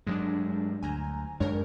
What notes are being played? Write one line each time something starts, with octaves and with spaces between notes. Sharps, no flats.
G2 F#3 G#3 D4
D2 G#5 A#5
F#2 G#3 D4 A#4 C#5